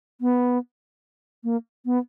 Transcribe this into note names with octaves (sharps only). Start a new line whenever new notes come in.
B3
A#3
B3